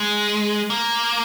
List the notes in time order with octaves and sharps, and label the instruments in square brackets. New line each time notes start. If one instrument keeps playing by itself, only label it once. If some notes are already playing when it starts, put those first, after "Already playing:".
Already playing: [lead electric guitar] G#3
A#3